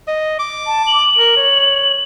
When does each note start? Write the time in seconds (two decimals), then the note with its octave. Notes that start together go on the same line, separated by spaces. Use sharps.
0.08 D#5
0.39 D6
0.67 A5
0.87 F#7
1.18 A#4
1.37 C#5